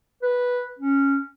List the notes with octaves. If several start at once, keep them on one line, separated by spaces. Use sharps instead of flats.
B4
C#4